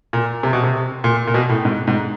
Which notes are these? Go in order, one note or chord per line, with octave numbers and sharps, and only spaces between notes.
A#2
C3
B2
C3
A#2
A#2
B2
A2
G#2
G#2